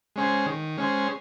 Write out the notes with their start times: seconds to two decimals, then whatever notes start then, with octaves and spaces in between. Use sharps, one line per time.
0.16 G#3 C#4 G#4 C5
0.46 D#3
0.77 G#3 C#4 G#4 C5